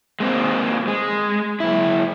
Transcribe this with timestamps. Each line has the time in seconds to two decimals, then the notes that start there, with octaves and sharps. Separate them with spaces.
0.20 G#3 A#3 C4
0.88 G#3
1.60 F#2 E4